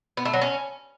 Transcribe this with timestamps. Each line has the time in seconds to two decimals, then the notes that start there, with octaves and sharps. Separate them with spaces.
0.17 B3
0.25 A3
0.33 F#3
0.41 C#4